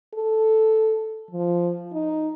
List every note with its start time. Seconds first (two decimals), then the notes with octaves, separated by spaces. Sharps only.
0.14 A4
1.31 F3
1.93 D#4